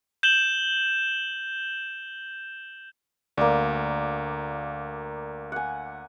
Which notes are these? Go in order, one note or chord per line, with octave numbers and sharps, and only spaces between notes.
G6 E7 F#7 G7
D2 A#3 D5
F#5 G#5